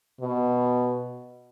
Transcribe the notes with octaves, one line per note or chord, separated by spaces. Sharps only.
B2